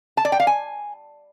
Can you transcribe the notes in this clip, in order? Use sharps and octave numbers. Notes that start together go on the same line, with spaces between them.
A5
D5
G5
F5
G#5